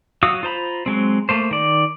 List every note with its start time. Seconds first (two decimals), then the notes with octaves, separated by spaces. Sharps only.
0.23 F#3 F#4 F5 D#6 E6
0.43 F4 C5 A#5 B5
0.86 F#3 G#3 C4
1.29 A3 A#3 C5
1.51 D#3 D5